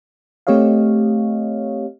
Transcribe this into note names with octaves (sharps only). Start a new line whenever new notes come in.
A3 C4 G4 C#5 D#5 F5